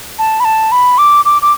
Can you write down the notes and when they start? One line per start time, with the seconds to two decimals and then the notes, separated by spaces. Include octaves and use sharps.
0.19 A5
0.40 B5
0.45 A5
0.72 B5
0.98 D6
1.25 D6
1.42 D6